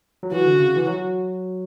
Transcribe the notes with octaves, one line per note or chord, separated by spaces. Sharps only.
F#3
E3 F#4
D3
C#3
E3
F#3